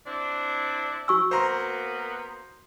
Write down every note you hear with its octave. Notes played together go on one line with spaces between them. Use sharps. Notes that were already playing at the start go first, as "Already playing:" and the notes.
C4 D4 E4
F#4 C#6 E6
A#3 B3 A#4 C5 A#5 C6